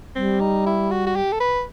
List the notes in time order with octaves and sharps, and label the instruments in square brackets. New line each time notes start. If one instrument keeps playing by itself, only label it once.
[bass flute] G3 [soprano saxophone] C4
[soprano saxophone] D#4
E4
F#4
F#4
G4
A4
B4